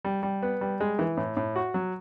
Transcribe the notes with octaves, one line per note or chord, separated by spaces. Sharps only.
G3
G3
B3
G3
G#3
E3
A2
A2
F#4
F#3